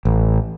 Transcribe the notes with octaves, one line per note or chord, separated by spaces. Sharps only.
A1